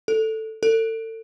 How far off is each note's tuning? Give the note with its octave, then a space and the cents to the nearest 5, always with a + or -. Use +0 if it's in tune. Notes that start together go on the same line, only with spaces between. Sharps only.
A4 +5
A4 +35